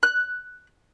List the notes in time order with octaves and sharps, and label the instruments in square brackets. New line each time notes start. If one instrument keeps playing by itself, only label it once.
[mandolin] F#6